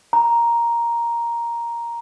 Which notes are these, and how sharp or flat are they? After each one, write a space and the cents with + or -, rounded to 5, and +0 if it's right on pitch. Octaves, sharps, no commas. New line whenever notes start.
A#5 +5